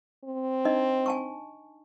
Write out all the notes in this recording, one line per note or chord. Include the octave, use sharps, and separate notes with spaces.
C4
D4 D#4 D#5
G#5 A5 C#6